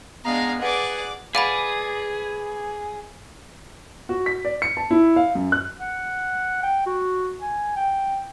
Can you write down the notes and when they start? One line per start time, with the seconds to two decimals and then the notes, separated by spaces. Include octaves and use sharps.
0.25 G#3 B3 D4 F5 A#5
0.62 G#4 B4 D5 F#5 D6
1.35 G#4 B4 D5 F5 F#5 B5
4.09 F#4
4.26 B6
4.45 D5
4.62 C#7
4.77 A5
4.91 E4
5.16 F5
5.35 F#2
5.52 F#6
5.80 F#5
6.63 G5
6.86 F#4
7.41 G#5
7.76 G5